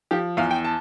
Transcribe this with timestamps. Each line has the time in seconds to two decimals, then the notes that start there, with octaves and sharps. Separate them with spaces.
0.11 F3 G4
0.37 E2 F5
0.51 G5
0.65 A5